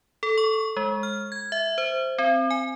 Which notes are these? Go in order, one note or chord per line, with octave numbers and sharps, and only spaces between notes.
A4
C#6
G#3
F6
G#6
E5
C5
C4
G#5